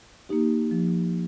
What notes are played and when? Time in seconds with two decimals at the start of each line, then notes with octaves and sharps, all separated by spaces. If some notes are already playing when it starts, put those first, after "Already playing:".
0.29 A#3 D#4 G4
0.71 F3